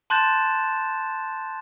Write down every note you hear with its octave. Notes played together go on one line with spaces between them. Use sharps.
A5 C6 F#6 G6 A6 E7